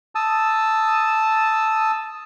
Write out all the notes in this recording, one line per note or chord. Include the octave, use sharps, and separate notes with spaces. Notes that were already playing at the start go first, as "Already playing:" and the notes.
A5 D#6 E6